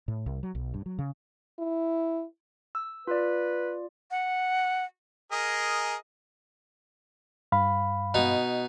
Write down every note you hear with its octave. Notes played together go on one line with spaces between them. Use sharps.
A2
C2
F#3
B1
G2
F#3
C#3
E4
E6
F4 B4 D5
F#5
G#4 A#4 D#5
G2 F5 B5
B2 D#4